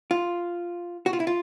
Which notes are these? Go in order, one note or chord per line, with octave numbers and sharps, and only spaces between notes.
F4
F#4
F4
E4
F4